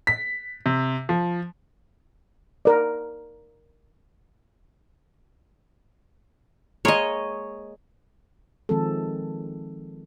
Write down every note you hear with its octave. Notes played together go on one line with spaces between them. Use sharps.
B6
C3
F3
A#4 D5
G#3 A#3 A#4 C#5 D#5
D#3 F3 G#3 C4 G#4 A4